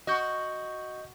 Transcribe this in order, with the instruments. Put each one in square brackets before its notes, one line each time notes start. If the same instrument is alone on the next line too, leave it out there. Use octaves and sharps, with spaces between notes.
[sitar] F#4 [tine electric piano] D#5 G6